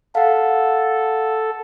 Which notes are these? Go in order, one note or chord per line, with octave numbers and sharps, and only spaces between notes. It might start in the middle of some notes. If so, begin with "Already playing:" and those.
A4 F5 F#5